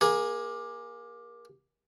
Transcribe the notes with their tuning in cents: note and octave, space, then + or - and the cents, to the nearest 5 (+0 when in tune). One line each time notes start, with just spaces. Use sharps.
A#3 +25 G#4 -10